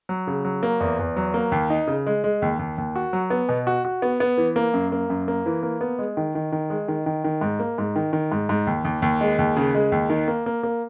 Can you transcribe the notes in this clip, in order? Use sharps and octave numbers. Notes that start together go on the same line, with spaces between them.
F#3
C#3
F#3
A#3
E2
E2
F#3
A#3
D#2
D#4
C#3
G#3
G#3
D#2
D#2
D#2
F#4
F#3
B3
B2
F#4
F#4
B3
B3
E3
A#3
F#2
A#3
F#2
A#3
E3
A#3
B3
G#3
D#3
D#3
D#3
G#3
D#3
D#3
D#3
G#2
A#3
G#2
D#3
D#3
G#2
G#2
D#2
D#2
D#2
G#3
D#2
C#3
G#3
D#2
D#3
A#3
A#3
A#3